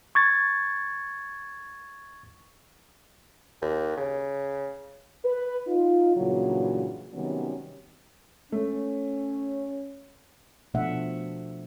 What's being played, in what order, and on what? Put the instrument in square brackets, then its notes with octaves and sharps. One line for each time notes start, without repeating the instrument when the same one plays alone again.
[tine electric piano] C#6 G#6 A6
[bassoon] D#2
C#3
[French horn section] B4
D#4 F4
G2 A#2 C#3 E3 F#3
C3 D#3 F#3 G3 B3 C#4
[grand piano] A3 [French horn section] C#4
[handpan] B2 F3 A3 D4 E5 F#5